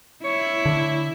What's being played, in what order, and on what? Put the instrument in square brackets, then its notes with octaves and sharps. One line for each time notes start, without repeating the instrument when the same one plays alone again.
[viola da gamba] E4 [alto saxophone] C#5
[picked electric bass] D3